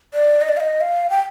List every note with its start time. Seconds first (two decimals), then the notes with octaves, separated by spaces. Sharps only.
0.14 D5
0.41 D#5
0.49 D5
0.57 F5
0.60 D#5
0.81 F5
1.10 G5